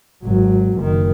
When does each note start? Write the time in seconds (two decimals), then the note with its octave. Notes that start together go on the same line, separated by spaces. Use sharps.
0.24 G#1 F#3
0.80 F#1 D#3